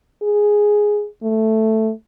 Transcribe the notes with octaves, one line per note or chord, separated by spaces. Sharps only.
G#4
A3